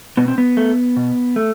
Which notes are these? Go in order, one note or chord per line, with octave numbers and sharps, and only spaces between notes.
B2 B3
C4
B3
A3
B2
A3